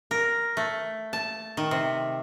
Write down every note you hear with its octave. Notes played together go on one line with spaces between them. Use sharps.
A#4
A3
A5
D#3
C3